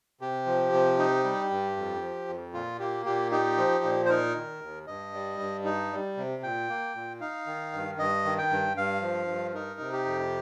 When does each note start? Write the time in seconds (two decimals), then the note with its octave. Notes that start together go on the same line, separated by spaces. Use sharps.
0.21 C3 G4
0.46 F3
0.73 C3
0.98 D#4
1.24 G3
1.51 G2
1.77 F2
2.02 F3
2.28 F2
2.54 A#2 F4
2.79 A#3 G4
3.06 A#2 G4
3.31 D#4 G4
3.58 F3
3.84 A#2
4.06 C5
4.09 D#4 A#4
4.36 D#3
4.62 D#2
4.87 G2 D#5
5.14 G3
5.39 G2
5.65 D#4
5.92 G3
6.17 C3
6.43 A#2 G5
6.69 A#3
6.95 A#2
7.21 D#4 F5
7.47 D#3
7.73 G2
7.98 G2 D#5
8.25 D#3
8.38 G5
8.51 G2
8.77 G2 F5
9.02 F3
9.28 G2
9.55 D#4 A#4
9.80 C3
9.93 G4
10.06 F2